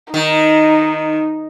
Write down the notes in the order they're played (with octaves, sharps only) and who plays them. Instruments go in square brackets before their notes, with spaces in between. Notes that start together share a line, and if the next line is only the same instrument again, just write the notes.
[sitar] D#3 [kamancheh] D#4